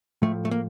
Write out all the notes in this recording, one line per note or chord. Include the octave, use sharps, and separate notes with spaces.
A2 F3 A3
A3
A#3